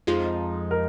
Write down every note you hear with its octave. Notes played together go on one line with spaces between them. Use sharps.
F2 F3 G#3 D#4 F4
A#4